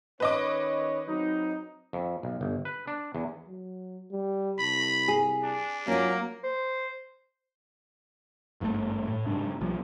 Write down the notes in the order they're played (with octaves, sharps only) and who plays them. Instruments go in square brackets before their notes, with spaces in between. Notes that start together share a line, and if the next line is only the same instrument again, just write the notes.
[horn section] D#3 C#4 C#5 [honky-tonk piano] B4 D#5 D6
[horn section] F#3 C4 D#4
[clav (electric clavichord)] F2
B1
G1
B4
D4
E2
[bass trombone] F#3
G3
[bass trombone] C2 [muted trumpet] B5
[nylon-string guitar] G#4
[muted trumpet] D4
[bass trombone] F#3 [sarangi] A#3 [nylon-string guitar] C#4 F4
[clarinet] C5
[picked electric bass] G#1 G2 C#3 A3
A2
F#1 G#2 D4
B1 F3 G3